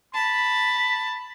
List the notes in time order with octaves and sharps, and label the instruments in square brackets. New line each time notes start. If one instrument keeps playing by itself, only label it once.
[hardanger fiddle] A5 [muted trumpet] B5